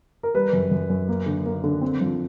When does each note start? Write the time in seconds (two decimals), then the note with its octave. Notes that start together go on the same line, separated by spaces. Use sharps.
0.23 A#4
0.34 G3 B4
0.53 F#2
0.71 F#2
0.90 F#2
1.09 A#3
1.26 D3
1.46 A#3
1.64 D3
1.81 C4
2.01 F3